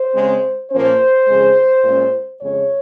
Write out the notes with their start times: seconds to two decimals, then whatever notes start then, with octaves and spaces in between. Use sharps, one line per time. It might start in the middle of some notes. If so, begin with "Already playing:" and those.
Already playing: C5
0.14 C#3 G#3 C4
0.71 A#2 F3 A#3 C#4 C5
1.28 F2 C#3 G#3
1.84 A#2 G#3 C#4
2.41 F2 C#3 G#3 C#5